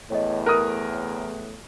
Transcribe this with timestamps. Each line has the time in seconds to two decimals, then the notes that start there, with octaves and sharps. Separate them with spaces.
0.10 E2 A2 C#5 D#5
0.46 A#4 D#6 F#6